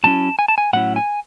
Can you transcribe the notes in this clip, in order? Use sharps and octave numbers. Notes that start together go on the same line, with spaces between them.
A2 F#3 C#4 E4 A5
G#5
A5
G#5
A2 F#3 C#4 E4 F#5
G#5